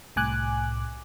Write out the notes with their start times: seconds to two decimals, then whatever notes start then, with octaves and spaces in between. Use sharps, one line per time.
0.16 C2 A2 G#5 D6 F#6